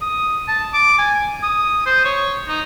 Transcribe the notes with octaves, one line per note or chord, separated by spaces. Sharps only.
D#6
A5
D6
G#5
D#6
C5
C#5
D#4